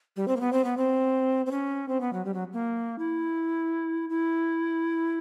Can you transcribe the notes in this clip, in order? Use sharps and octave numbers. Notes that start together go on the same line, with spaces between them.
G3
C4
A#3
B3
C4
B3
C4
C4
C#4
C4
B3
F#3
G3
F#3
A#3
E4
E4